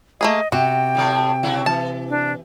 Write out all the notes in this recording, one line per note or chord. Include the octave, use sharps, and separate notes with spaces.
A3 A#3 G#4 D#5
C3 F#4 G5
A2 F#3 A3
C#3 F#3 E4
E3 A5
D4